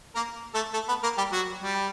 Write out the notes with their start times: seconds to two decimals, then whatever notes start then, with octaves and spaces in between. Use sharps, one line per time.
0.15 A#3 A#4
0.54 A3 A4
0.73 A3 A4
0.88 B3 B4
1.03 A#3 A#4
1.18 G3 G4
1.32 F#3 F#4
1.61 G3 G4